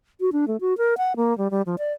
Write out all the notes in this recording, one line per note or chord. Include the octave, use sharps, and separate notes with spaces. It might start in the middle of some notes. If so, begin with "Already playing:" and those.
F#4
D4
A3
F#4
A#4
F#5
A#3
G3
G3
F3
D5